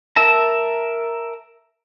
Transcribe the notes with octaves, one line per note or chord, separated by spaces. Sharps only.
A#4 E5 A5 A#5